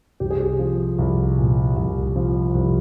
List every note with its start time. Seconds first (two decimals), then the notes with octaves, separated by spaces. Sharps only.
0.20 C2 G4
0.30 G#4
0.40 G4
0.59 F3
0.99 C2
1.38 A#2
1.76 C2
2.16 F3
2.54 C2